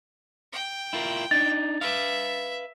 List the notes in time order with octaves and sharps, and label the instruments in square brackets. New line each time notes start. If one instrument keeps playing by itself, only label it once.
[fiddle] G5
[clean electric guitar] E4 F4 A#4
[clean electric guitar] D4 D#4 [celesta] A6
[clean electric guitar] B4 F5 [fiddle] E5